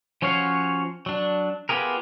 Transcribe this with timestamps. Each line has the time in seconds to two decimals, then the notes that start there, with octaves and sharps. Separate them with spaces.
0.22 F3 C#4 F#4 C#5 F5
1.06 F#3 D4
1.69 B3 F4 G4 G#4 A#4